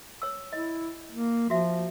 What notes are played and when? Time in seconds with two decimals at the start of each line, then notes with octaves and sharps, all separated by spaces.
0.22 C#5 E6
0.53 E4 D#5
1.11 A#3
1.50 F3 F#4 E5